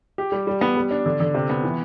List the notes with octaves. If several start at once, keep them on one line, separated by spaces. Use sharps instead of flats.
G4
G3
G3
B3
G3
D4
D3
D3
C3
B3
E3